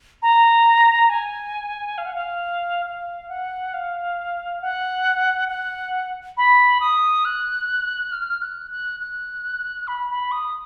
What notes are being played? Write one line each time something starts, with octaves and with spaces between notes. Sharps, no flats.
A#5
G#5
F5
F#5
F5
F5
F#5
F5
F#5
F#5
B5
D#6
F#6
F6
F#6
F#6
F#6
B5
B5
D#6